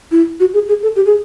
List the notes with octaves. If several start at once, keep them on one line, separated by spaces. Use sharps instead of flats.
E4
F#4
G#4
G#4
A4
G4
G#4